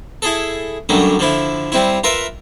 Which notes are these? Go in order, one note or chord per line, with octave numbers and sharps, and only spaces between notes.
E4 G#4 A4
F#2 D3 F#3 G3 A3
D3 F3 E4
G3 C4 E4
F4 A#4 B4 E5